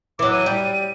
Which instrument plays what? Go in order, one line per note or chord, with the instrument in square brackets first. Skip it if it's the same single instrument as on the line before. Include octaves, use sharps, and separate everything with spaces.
[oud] E3 F#3 [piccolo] D6
[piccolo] D#7
[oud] G3